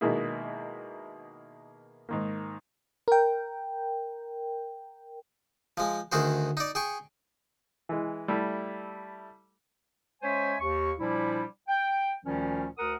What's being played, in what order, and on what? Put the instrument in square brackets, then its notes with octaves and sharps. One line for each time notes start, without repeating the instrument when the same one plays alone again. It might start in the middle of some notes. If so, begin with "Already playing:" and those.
[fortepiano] B2 D#3 G#3 A#3 E4 G#4
G#2 D#3 A#3
[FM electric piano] A#4 G5
[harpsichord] F3 G#3
D2 D#3 F#4 G#4 C5
D#4 D5
G#4 G5 C#6
[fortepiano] E3 G#3
G3 A3 E4
[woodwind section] G#3 C#4 C5 C#5 E5 G#5
D#2 C#6
A#2 F3 G3 D4 E4
G5
D2 A#2 D#3 F3 G3 C#4
D2 A#4 F#5 D#6